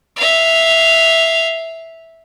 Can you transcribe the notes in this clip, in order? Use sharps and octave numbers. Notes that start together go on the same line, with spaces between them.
E5 F5